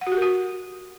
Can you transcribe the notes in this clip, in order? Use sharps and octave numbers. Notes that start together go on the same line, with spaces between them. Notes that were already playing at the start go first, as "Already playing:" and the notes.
F#5
F#4
G4
A#4
F#4